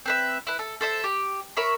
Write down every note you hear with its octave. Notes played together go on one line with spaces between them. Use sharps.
C4 B4 E5
E4 B4
A4
A4 C5 E5
G4
A#4 C#5 E5 B5